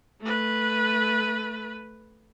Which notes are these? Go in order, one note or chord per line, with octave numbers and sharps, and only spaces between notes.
A3 B4